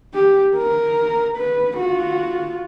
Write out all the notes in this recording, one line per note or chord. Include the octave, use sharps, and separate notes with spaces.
G4
A#4
B4
F4 F#4